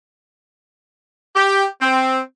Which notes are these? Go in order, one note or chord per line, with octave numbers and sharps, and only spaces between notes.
G4
C4